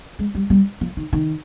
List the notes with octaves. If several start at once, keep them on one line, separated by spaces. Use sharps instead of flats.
G#3
G3
G3
F3
D#3
D#3